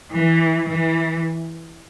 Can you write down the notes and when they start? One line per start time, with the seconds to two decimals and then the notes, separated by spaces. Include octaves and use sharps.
0.16 E3
0.70 E3